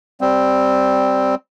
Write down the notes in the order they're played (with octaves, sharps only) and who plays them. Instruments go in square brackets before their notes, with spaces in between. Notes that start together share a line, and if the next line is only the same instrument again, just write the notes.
[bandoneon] G3 C4